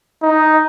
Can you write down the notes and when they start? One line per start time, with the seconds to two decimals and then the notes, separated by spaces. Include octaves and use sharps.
0.22 D#4